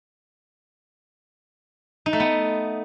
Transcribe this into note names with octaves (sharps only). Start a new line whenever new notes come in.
D#4
A3
B3